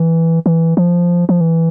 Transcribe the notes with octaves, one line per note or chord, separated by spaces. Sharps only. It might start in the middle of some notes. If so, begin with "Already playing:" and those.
Already playing: E3
E3
F3
F3
E3